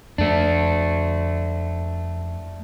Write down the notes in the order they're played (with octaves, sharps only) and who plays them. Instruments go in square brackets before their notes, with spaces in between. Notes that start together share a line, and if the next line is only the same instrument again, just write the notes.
[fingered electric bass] F2 [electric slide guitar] A3 D4